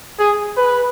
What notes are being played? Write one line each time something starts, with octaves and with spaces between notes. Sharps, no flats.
G#4
B4